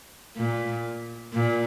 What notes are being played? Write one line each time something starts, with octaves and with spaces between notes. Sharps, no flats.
A#2
A#2